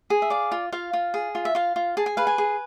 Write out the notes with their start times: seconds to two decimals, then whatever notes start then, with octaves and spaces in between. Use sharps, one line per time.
0.10 G#4
0.22 E5
0.30 D5 F5
0.52 F4
0.72 F4 F5
0.93 F4
1.14 G#4
1.35 F4
1.45 E5
1.55 F4 F5
1.76 F4
1.97 G#4 A5
2.06 G#5
2.17 B4 F5
2.27 G#5
2.38 G#4